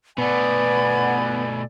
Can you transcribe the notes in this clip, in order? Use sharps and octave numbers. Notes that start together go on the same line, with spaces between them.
B2 A3 B3 D5 G#5 B5